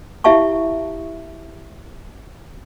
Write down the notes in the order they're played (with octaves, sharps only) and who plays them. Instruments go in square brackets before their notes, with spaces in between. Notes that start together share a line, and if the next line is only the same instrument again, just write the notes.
[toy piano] E4 G4 E5 F5 A5 C#6